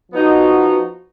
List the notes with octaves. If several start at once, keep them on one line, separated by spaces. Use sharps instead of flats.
F3 B3 D#4 F#4